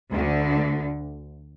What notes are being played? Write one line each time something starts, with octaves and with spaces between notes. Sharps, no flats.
D2 D3